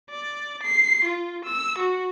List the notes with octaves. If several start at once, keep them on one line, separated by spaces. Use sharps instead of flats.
D5
C7
F4
E6
F#4